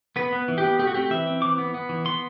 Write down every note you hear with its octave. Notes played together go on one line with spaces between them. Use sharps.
B3 B4
B3
E3
G4
B3
A3 G4
F#4
C4 G4
E3 E5
C4
E3 D6
B3
B3
E3
B3 C6